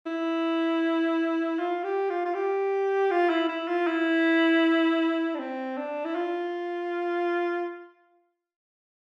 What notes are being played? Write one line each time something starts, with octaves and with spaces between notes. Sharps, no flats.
E4
F4
G4
F4
F4
G4
F4
E4
E4
F4
E4
D4
C4
D4
E4
F4